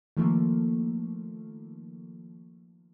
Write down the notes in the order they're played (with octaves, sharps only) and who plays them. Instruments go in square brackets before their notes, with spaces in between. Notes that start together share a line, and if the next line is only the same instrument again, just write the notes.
[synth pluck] D#3 F3 A3 A#3